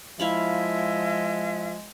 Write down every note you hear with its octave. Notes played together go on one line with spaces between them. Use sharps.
F3 G#3 E4 E5 F5 B5